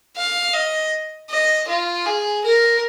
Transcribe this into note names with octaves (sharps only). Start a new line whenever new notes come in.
F5
D#5
D#5
F4
G#4
A#4